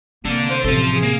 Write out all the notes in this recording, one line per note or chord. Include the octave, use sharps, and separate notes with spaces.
C3 A#3 D4 A4
C5
A1 C3 F3 A4 C6
G#4
A#3